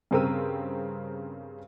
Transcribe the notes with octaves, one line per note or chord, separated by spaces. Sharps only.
G2 C#3 C4 A#4 E6 D#7